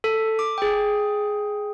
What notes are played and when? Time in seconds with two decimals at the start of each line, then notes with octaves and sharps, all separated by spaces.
0.04 A4
0.39 D6
0.58 G#4 G5